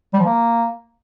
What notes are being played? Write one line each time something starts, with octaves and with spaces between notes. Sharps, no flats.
G3
F3
A#3